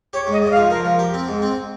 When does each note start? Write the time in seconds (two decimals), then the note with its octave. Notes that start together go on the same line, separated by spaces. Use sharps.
0.13 G4 C#5
0.27 G#2
0.32 D#5
0.42 G#2 D#5
0.51 F5
0.56 F3
0.70 F3 A#4
0.85 F3
0.99 G4
1.14 C4
1.28 G#2
1.42 C4